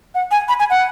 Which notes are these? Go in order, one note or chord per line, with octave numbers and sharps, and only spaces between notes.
F#5
G#5
B5
G#5
F#5